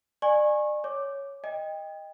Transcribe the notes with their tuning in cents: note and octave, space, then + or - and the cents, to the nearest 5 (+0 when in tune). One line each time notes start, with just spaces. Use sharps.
D5 +30 G#5 +0 C#6 -30
C#5 +0 D6 +5
D#5 +0 G5 +25